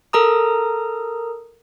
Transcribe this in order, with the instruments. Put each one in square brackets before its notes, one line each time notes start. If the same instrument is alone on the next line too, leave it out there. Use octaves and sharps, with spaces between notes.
[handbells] A4 A#4 A#5 D#6